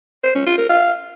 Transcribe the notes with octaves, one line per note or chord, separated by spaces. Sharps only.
C5
C#4
F4
A#4
F5